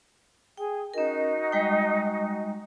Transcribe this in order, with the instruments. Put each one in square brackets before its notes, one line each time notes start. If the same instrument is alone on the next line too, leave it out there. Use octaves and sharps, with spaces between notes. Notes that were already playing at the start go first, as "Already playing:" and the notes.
[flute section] G#4 [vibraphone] G5
[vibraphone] C#4 A#4 [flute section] D#4 F#4 D#5
[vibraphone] G3 G#3 G5